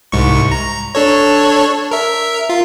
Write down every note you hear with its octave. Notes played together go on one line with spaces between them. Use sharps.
C2 G#2 C#6
A#5
D4 A4 C#5
A#4 E5
F4